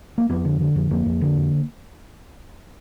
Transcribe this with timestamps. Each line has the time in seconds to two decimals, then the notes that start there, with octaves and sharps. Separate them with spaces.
0.18 A#3
0.30 F2 B3
0.45 D3
0.60 D3
0.76 F2
0.91 F2 A#3
1.06 F2
1.21 D3
1.37 F2